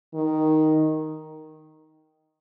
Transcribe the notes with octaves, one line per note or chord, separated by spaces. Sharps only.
D#3